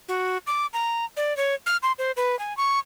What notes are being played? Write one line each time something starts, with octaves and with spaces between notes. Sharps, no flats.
F#4
D6
A#5
D5
C#5
F6
C6
C5
B4
G#5
C#6